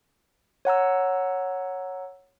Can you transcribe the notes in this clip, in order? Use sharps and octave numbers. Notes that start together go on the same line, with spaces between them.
C#5 F#5 A#5 E6